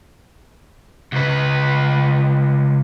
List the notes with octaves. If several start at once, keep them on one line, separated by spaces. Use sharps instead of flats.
C#2 B4